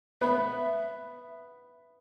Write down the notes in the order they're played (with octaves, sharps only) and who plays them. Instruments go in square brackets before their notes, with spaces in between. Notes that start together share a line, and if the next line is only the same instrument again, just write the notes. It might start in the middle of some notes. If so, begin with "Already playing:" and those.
[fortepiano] B3 [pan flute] E5